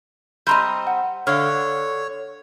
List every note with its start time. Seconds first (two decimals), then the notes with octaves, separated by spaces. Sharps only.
0.47 G3 C4 D#5 A#5 C6 G6
0.87 F#5
1.27 D3 C#5 F5 F6